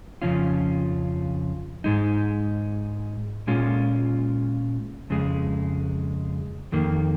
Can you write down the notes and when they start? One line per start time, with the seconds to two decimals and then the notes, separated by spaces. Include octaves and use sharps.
0.22 F2 C#3 F3 C#4 F4
1.84 G#2 G#3 D#4
3.47 A#2 G#3 C#4 F4
5.10 F2 C#3 G#3
6.72 F2 D#3 A#3